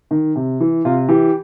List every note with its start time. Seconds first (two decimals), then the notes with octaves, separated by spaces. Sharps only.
0.11 D#3
0.36 C3
0.60 E3
0.85 C3 F4
1.09 E3 G4